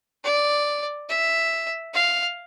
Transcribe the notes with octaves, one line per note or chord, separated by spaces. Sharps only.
D5
E5
F5